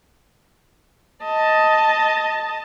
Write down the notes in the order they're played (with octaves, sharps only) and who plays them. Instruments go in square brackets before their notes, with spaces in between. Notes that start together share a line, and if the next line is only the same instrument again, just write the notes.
[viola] D#5 A5